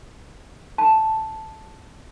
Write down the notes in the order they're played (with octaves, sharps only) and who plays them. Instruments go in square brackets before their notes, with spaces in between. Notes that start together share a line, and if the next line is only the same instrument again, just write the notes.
[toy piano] A5